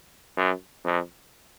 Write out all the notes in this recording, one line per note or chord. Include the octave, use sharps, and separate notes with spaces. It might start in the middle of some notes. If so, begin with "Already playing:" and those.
F#2
F2